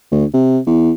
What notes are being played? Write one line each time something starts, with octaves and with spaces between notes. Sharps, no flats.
D2
C3
E2